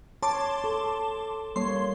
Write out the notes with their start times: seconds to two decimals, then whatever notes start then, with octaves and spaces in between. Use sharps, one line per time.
0.23 C#5 A5 C6 D6
0.64 A4
1.56 G3 A#3 C#5 C6